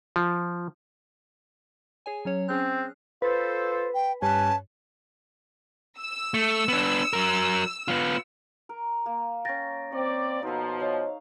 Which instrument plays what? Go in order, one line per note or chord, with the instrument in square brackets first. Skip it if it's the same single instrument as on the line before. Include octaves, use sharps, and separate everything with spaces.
[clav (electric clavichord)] F3
[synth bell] G#4 C#5 G#5
F#3 C#4 C#5
[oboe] C4 [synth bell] C#4 G#4 F#6
[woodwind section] F4 A4 C5 [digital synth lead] B4
[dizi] G5
[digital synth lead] G2 [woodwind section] C#4 B4 G#5 [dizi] A5
[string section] E6
[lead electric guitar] A3
B3 D4
F#3 A#4
B3 F4
[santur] A#4
A#3
[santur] C#4 G5 [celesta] A6 A#6
[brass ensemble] C4 D5 [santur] C#5
[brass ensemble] B2 F3 [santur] D#4 A4
[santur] A4 F5 [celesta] C5 C#5 D#5